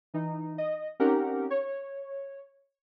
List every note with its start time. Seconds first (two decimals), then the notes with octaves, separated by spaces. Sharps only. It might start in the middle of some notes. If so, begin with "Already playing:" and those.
0.14 E3 D#4
0.58 D#5
1.00 C4 C#4 D#4 G4 A#4 F#5
1.50 C#5